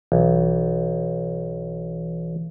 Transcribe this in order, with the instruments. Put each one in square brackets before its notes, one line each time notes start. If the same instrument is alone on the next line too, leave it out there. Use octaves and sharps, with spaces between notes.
[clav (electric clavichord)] B1 [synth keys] E3